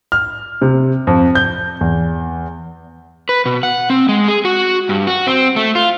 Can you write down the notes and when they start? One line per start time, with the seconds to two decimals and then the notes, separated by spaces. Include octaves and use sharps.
0.12 F6
0.62 C3
1.07 F2
1.35 G6
1.81 E2
3.29 B4
3.46 B2
3.63 F#5
3.90 C4
4.09 G#3
4.28 G#4
4.45 F#4
4.89 G2
5.07 F#4
5.27 C4
5.56 A3
5.75 F4